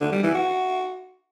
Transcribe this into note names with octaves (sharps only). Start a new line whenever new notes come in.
D3
G3
E3
F#4